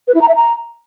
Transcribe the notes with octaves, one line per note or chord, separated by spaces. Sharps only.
B4
E4
A#5
E5
A#5